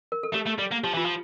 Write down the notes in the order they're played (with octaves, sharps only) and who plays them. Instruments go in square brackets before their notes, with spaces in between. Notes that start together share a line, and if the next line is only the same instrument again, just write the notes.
[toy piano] A#4
A4
[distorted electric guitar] A3 [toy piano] G4
[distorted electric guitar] A3
G3
A#3
[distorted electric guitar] F3 [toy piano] G4
[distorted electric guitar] E3 [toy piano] F4
[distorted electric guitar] F3